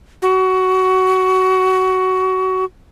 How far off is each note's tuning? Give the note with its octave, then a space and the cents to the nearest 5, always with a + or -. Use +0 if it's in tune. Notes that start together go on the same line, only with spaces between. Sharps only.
F#4 +20